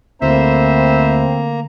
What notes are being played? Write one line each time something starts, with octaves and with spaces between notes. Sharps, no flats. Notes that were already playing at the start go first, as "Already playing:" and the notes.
D2 A#3 C4 E4 C5 E5 A#5